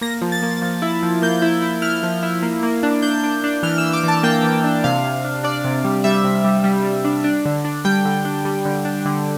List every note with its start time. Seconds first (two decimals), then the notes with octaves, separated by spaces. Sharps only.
0.01 A#3 A#6
0.22 F3
0.32 A6
0.42 A#3
0.62 F3
0.82 E4
1.03 F3
1.22 A#3 G6
1.42 E4
1.62 E4
1.82 E4 F6
2.03 F3
2.23 E4
2.43 A#3
2.63 A#3
2.83 D4
3.02 D4 G6
3.24 D4
3.44 D4
3.63 E3 F6
3.78 E6
3.83 E3
3.93 D6
4.04 E3 A5
4.23 A#3 G5
4.43 E3
4.64 D4
4.84 C3 F5
5.04 C3
5.25 D4
5.43 D4 D5
5.64 C3
5.84 G3
6.04 G3 E5
6.24 C3
6.44 G3
6.64 G3
6.85 G3
7.05 D4
7.24 D4
7.45 D3
7.65 D4
7.85 G3 G5
8.05 D3
8.25 D4
8.45 G3
8.65 D3
8.85 D4
9.06 D3